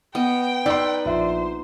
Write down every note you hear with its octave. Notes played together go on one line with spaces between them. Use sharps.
B3 D#5 G5
D#4 B4 D5 C6 E6
A#1 C5 E5